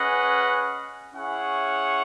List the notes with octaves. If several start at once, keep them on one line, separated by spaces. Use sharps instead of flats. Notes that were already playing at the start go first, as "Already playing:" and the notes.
Already playing: C#4 G#4 B4 D#5 F#5
C#4 E4 G#4 C#5 F#5